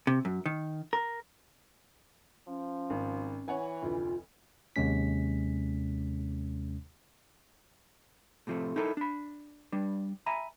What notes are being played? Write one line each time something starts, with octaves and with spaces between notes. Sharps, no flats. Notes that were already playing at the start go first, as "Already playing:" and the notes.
C3
F#2
D#3
A#4
F3 C#4
G#1
E3 C#5 F#5 G#5
F1 D2 F4
D#2 C3 G#3 C#4 B6
A2 C3 F3 G#3 A3
D#4 E4 A4 A#4
D4 B5
G3 D4
E5 G#5 A#5 B5